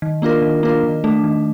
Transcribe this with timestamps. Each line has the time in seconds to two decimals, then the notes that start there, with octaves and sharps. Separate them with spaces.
0.02 D#3
0.22 A#3 D4 F4 A#4
0.42 D#3
0.63 A#3 D4 F4 A#4
0.83 D#3
1.04 A3 D4
1.24 D#3